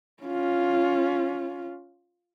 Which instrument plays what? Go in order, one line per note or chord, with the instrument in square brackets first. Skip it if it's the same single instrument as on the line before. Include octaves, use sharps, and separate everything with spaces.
[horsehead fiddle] C#4 F4